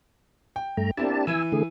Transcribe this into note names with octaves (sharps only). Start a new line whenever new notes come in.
G5
G2 A3 A#5
A#3 C4 D4 E4 G4 A5
E3 E4 G#5 E6
D3 A3 G#4